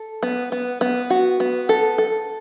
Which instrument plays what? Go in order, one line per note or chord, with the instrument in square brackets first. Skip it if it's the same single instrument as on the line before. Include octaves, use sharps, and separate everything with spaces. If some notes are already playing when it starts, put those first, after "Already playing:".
Already playing: [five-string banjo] A4
B3
B3
B3
F#4
B3
A4
A4